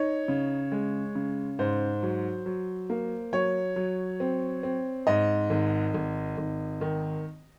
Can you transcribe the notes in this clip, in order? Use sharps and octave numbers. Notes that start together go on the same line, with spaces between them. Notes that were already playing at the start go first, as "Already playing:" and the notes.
Already playing: D#4 C#5
C#3
G#3
C#3
G#2 C5
F#3
F#3
A#3
F#3 C#5
F#3
C4
C4
G#2 D#5
G#1
G#1
G#1
D#3